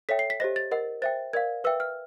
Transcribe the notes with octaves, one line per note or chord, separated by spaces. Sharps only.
A4 C#5 E5 G5 B6
C7
B6
G4 C5 D#5 A#6
A6
A#4 D#5 F#5
C5 E5 G5 A6
A#4 D5 F5 G#6
B4 E5 G5 E6
F6